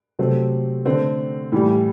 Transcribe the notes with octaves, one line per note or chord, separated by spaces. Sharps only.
C3 F#3 A3 C4
D3 A3 C4
A2 E3 G3